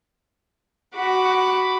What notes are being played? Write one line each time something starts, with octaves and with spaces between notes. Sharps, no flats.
F#4 B5 D6